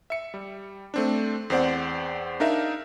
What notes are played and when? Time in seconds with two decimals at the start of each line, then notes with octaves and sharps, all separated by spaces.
0.10 E5 C#7
0.34 G3
0.94 A3 C4 D4
1.50 E2 C4 C5 D5 F#5
2.40 D4 D#4 A#4 E5 F5